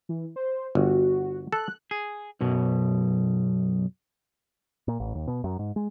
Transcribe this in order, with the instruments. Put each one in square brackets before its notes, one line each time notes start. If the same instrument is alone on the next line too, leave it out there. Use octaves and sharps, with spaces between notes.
[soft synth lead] E3
C5
[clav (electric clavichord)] G1 [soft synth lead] F#4
[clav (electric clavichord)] A4 [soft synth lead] F#6
[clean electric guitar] G#4
B1 F#2 B2
[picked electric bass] A#2
A1
D#2
B2
F#2
G#2
G#3